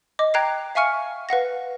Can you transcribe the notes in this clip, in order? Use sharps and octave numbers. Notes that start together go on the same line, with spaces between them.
D#5 D6
G5 A#5 F#6 G#6 A#6 C7
E5 F5 G#5 C#6 F6 C#7
B4 F5 F#5 A#6